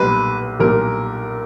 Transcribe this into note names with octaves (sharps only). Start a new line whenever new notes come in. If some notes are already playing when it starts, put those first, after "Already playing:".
Already playing: B1 A#2 G3 B4
B1 A#2 G3 A#4